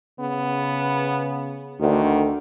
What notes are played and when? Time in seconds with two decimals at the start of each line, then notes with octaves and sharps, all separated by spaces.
0.20 C#3 B3
1.80 D2 D3 D#3